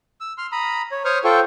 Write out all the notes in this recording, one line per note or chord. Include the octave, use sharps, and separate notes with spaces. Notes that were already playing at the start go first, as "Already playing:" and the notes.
E6
C6 F6
A#5 B5 D#6
C#5
C5 C#5 C#6 D#6 F6
F4 A4 C5 G5 C#6